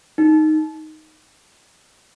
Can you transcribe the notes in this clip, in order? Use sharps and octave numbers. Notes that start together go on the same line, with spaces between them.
D#4